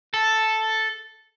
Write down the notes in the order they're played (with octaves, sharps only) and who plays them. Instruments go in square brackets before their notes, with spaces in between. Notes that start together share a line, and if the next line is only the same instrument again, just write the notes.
[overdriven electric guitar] A4